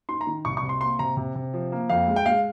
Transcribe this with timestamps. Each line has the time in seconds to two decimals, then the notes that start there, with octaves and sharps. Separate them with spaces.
0.09 D#4 C6
0.21 A#5
0.27 D#3
0.45 C2 C#6
0.57 C#6
0.63 C3
0.69 C6
0.81 A#3 C6
0.99 C3 A#5
1.17 C3
1.35 C3
1.54 F3
1.72 A#3
1.90 F2 F5
2.08 G#3
2.16 G5
2.26 G#3 F5